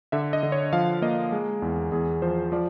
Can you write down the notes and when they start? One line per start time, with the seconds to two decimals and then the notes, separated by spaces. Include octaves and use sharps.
0.12 D3 E5
0.33 D#5
0.43 D3
0.52 C#5
0.73 F3 F5
1.02 A#3 D#5
1.32 G#3
1.62 E2
1.92 E2 G#4
2.22 F3 C5
2.52 F3 D5